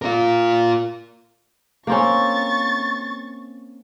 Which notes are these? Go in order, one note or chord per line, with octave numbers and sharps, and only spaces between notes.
F4 A#4
A#3 C4 C#4 C#6 A6